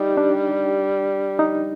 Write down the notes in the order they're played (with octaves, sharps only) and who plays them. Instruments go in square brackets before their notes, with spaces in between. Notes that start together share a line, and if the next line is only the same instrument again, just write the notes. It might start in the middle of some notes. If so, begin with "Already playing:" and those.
Already playing: [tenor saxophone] G3 [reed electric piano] D#4 G4
[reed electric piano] D4
D#4